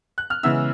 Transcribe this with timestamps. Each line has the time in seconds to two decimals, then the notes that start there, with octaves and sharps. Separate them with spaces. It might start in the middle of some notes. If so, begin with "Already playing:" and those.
0.18 F#6
0.30 F6
0.43 C#3 E3 G#3 B3 E5 E6